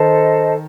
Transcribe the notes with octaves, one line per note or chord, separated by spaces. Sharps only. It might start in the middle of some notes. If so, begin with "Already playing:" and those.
Already playing: D#3 A4 C5 D#5 A5